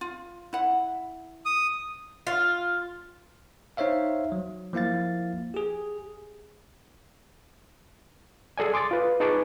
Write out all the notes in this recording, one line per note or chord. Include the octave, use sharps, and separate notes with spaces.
F4
E4 F#5
D#6
F4
D#4 C5 C#5 E5 F5
F#3
F3 A#3 E4 F5 A6
G4 G#4
G#4 A4 D5 G#5
C6 D6 D#6 A6
F4 B4
D#4 G#4 B4 A5 C#6 D6